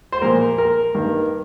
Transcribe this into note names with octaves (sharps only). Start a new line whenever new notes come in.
C5
A#2 F3 A#3 A#4
A#4
G2 D#3 A#3